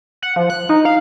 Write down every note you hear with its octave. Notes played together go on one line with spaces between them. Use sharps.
F#5
F3
F#6
D#4
F5